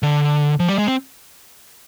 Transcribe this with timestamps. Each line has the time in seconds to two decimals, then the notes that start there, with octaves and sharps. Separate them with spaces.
0.03 D3
0.60 F3
0.68 G3
0.78 G#3
0.87 C4